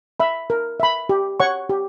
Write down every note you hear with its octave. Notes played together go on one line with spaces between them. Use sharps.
E5 B5
A#4
E5 B5
G4
C#5 F#5 C#6
G4